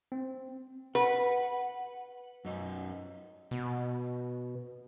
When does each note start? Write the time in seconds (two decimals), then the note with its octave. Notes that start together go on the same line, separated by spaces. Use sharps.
0.12 C4
0.95 B4 F#5
2.45 F#2 D#4
3.51 B2